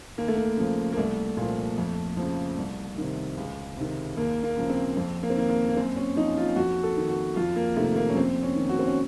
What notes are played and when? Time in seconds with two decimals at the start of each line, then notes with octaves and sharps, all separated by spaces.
0.18 D#2 A#3
0.28 A3
0.37 A#3
0.57 C#3 F3
0.93 A#3
0.97 C2 A3
1.37 A#2
1.42 F3
1.78 F2
2.17 F3
2.22 C#3
2.58 C2
2.98 C3 D#3
3.37 C#2
3.77 C3 D#3
4.17 D#2 A#3
4.43 A#3
4.57 C#3 F3
4.70 C4
4.97 F2 C4
5.23 A#3
5.30 C4
5.37 D#3 A#3
5.50 A#3
5.69 A#3
5.77 F#2 C4
5.96 C#4
6.16 F3 D#4
6.37 F4
6.56 F2 F#4
6.83 A4
6.97 D#3
7.10 F#4
7.36 F2 F4
7.56 A#3
7.76 C3 D#3 A3
7.96 A#3
8.10 C#4
8.16 F2 C4
8.43 C#4
8.56 D#3
8.69 F#4
8.79 C4
8.87 C#4